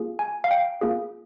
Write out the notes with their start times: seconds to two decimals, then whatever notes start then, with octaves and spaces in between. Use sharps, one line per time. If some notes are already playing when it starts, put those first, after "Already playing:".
Already playing: A#3 F4 G#4
0.19 G#5
0.44 F5
0.51 G5
0.81 A#3 F4 G#4